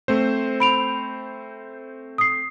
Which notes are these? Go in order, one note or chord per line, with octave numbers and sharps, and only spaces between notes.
A3 C4 C5
B5 D7 F7
D#6 C7